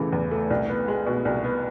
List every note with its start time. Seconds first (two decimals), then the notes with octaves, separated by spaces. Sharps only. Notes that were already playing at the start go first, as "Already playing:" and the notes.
Already playing: E2 C#3 E3 A3
0.13 E2
0.31 A3
0.50 C2
0.69 B3
0.88 G#3
1.06 B2
1.25 C2
1.44 B3